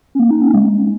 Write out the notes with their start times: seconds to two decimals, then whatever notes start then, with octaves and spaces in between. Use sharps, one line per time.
0.15 C#4
0.19 A#3
0.30 D#4
0.42 C#4
0.54 G#3